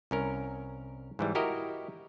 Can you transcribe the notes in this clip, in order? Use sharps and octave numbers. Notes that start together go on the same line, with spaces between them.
C2 C#4 A#4
G#2 E3 G3
E4 F#4 G4 A#4 D#5